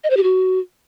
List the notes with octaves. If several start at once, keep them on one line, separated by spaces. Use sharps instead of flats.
D#5
C5
G4
F#4